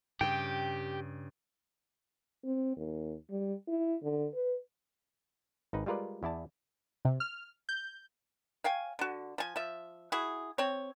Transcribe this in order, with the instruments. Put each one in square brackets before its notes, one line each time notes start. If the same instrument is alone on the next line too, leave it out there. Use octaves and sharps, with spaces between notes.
[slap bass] G2 C#3 [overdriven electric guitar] G4 [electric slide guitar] G5
[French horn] C4
D#2
G3
E4
D3
B4
[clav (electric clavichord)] G#1 D#4 B4
G3 G#3 F4 A#4 B4 D5
E2 E4 D5 A5
[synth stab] C3
F6
G6
[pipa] C#5 F5 G5 G#5
D3 F#4
F3 G#5
F3 E5
E4 F#4 G#4
C4 C#5